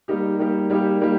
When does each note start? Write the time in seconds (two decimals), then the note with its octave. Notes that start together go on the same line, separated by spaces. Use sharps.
0.08 G3 A#3 D#4 G4
0.39 G3 A#3 D#4 G4
0.70 G3 A#3 D#4 G4
1.01 G3 A#3 D#4 G4